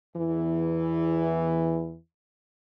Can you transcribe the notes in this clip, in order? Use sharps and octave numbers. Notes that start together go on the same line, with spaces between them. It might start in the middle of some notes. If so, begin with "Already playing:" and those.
E2 E3